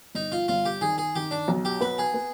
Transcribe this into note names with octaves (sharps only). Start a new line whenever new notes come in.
G1 D#4
F4
G1 F4
G4
D#3 G#4
G#4
D#3 G4
D4
B1
G4
B3 B4
G#4
B3